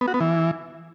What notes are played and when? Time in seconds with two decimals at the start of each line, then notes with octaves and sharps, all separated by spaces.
0.01 B3
0.08 F#4
0.14 B3
0.20 E3